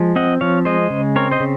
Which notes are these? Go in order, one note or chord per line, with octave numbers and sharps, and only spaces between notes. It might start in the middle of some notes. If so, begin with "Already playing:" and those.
Already playing: F3 G#3
C4 D#5 F#5
F3 C#5 F5
G#3 C5 D#5
C#3
C4 A#4 C#5
C5 D#5
C#3